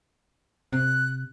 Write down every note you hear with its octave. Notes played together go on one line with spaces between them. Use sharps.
C3 F#6